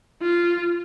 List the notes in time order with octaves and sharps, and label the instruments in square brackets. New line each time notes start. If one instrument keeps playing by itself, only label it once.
[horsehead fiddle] F4